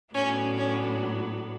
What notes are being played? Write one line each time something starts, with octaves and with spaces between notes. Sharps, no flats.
A2 F#3 B3 C#4 D4
C#4